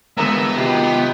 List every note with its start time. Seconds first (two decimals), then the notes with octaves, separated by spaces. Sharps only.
0.18 G1 E3 G#3 B3 A#4 E5
0.55 C3 D#3 F#3 F4 G4